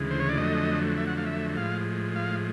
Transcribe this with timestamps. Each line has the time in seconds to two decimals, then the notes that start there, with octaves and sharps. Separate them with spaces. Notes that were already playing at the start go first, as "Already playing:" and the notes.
Already playing: D2 C#3 E3 G#3
0.11 C5
0.20 C#5
0.29 D5
0.38 F2 D3 F#3 A3 D#5
0.97 E5
1.07 F#5
1.18 F5
1.26 E5
1.57 A2 F3 G#3 F5
2.16 F5